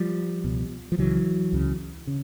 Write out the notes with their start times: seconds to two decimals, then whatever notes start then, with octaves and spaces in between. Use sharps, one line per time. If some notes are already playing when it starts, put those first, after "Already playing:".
Already playing: F3 G3
0.44 C#2 B2
0.92 F3
0.98 C#2 C#3 E3 F#3
1.52 C#2 C#3
2.07 C#3